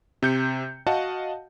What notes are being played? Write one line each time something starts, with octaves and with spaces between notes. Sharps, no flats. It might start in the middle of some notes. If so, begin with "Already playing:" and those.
C3 G6 C#7
F#4 D#5 F5 F#5 A5